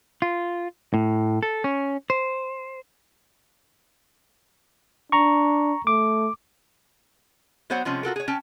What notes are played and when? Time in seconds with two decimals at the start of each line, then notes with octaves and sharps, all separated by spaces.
0.22 F4
0.94 A2
1.43 A4
1.64 C#4
2.10 C5
5.12 D4 A#5 C#6
5.87 A3 D6
7.70 F#3 B3 C5 C#5 F#5
7.85 C3 F3 G#3 C#4
8.03 F4 F#4 A4 A#4
8.16 G#4 C#5
8.28 C#4 G5 A5